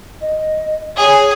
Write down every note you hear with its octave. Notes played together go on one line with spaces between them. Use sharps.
D#5
G#4 C#5